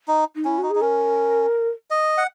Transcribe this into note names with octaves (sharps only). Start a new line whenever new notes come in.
D#4
D#4
C#4 E4
D#4 F#4
G#4
D#4
C#4 A#4
D#5
F#5